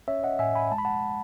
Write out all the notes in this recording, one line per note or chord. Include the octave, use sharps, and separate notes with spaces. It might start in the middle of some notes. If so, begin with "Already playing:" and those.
C#4 C#5 E5
D#5 F#5
A2 E5 G#5
G#5 B5
G#3 A5
B5
F#5 A5